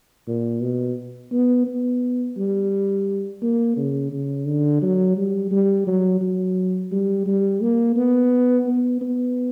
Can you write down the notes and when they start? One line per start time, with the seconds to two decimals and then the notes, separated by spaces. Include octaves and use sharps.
0.28 A#2
0.62 B2
1.32 B3
1.67 B3
2.38 G3
3.42 A#3
3.77 C#3
4.12 C#3
4.46 D3
4.82 F#3
5.17 G3
5.51 G3
5.87 F#3
6.21 F#3
6.92 G3
7.26 G3
7.61 A#3
7.96 B3
8.67 B3
9.01 B3